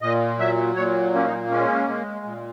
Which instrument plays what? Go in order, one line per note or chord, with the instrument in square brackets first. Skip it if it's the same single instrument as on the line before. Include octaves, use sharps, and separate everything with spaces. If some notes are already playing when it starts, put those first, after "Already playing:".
[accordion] A#2 D#5
F#3 E5
A#2 C#5
A#3 C#4
D#4
G#3 C#4
G#3
A#2